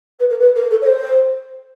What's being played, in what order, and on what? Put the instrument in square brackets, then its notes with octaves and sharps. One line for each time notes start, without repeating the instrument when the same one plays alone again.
[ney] B4
A#4
B4
A#4
A4
C#5
C5